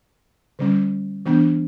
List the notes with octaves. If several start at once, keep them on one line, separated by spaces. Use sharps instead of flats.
D3 G3 C#4
E3 B3 D4